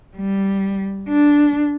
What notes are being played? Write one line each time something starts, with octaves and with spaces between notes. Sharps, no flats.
G3
D4